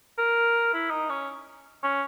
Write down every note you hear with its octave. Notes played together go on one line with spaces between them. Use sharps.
A#4
E4
D#4
C#4
C#4